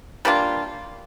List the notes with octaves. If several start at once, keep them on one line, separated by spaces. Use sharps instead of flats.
G3 A#3 D4 F4